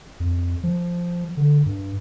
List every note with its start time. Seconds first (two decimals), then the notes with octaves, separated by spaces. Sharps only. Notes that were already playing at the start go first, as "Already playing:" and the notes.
0.20 F2
0.63 F3
1.37 D3
1.66 G2